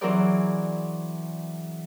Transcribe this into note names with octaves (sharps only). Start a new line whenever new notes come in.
E3 F#3 C4 G#4 A#4 D5